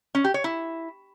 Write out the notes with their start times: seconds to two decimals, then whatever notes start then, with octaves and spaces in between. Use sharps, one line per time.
0.15 C#4
0.24 G4
0.34 C#5
0.44 E4